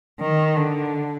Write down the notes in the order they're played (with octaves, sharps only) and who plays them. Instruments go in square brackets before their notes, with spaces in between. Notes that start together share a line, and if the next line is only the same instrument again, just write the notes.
[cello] D#3
D3